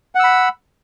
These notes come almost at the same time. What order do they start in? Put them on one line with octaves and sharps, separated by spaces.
F#5 E6 B5